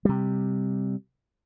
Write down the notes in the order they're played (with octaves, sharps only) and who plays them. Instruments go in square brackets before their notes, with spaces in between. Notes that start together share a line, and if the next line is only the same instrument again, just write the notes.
[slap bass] C3 G3